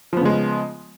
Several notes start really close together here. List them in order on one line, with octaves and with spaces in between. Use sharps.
F3 B3 C#3 G#3